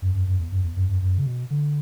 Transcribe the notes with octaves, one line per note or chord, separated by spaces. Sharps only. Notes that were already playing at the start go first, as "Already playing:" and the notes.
F#2
F#2
F#2
E2
F#2
E2
F#2
F#2
F#2
C#3
B2
D3